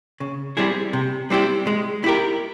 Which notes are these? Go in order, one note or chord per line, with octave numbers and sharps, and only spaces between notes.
C#3
G3 C4 E4 G#4
C3
G3 C4 E4 G4
G#3
E4 G4 A#4